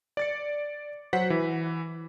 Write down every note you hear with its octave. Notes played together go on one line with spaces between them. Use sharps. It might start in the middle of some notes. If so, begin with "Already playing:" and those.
D5 A6 C#7
F#3 C5 F#5 B6
E3